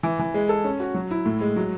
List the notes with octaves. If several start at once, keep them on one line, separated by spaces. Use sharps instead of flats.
E3
E3
G#3
A4
C#4
F#4
F#3
E4
A2
G#3
F#3